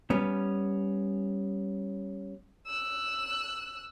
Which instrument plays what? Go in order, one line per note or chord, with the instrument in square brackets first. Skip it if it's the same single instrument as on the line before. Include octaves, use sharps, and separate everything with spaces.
[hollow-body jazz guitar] G3 B3 C#4
[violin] E6 F#6